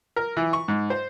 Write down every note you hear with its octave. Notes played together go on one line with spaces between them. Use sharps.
A#4
E3
C#6
G#2
C5